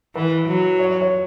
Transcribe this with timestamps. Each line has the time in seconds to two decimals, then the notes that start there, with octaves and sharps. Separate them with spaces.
0.15 E3 B4
0.48 F#3
0.79 C#5
0.90 C#5
1.01 C#5